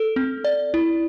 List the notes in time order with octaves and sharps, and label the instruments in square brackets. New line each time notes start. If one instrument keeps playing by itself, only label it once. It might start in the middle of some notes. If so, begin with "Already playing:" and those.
Already playing: [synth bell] A4
C4
D5
E4